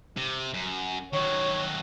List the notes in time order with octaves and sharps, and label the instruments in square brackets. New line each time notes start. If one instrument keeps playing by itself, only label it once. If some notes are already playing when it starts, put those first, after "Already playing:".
[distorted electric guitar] C3
F#2
[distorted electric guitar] D#3 F#3 [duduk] C#5